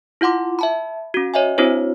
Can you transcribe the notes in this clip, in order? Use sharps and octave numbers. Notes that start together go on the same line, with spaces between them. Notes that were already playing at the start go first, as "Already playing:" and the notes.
E4 F4 F#5 C6 D6
E5 A5 B5
C#4 F#4
C#5 D#5 E5 G#5
C4 D4 E4 F#4 C5 C#5